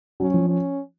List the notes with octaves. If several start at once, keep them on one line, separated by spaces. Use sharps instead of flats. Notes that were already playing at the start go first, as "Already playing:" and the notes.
F#3 C#4
F3
C#4